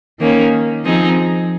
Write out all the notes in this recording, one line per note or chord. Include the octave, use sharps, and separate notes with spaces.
D#3 A#3 C#4
F3 C4 D#4 G#4